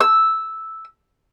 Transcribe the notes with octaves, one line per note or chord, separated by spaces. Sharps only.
E6